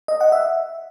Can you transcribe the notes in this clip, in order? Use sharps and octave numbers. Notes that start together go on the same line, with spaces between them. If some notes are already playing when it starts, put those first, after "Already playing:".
D#5
F#5
E5